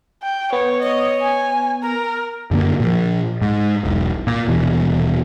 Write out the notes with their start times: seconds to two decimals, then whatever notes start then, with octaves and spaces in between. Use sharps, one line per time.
0.23 G5
0.53 B3 C#5
0.82 C#5 D#5
1.22 G#5
1.83 A#4 A#5
2.51 F#2 D3 A#3
2.80 A#2 F3
3.41 G#2
3.84 E1 B1
4.27 A#2
4.48 D#1 B2 E3